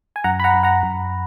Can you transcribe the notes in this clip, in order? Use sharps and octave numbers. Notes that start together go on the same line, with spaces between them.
G#5
F#2 F#5 A#5
B5
F#5 A#5
F#2
F#5 A#5
F#2